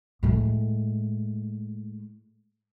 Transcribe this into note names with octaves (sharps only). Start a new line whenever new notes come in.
A2 G#3